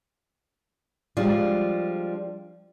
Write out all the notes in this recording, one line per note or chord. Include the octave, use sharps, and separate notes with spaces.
F3 G3 G#3 D4 F4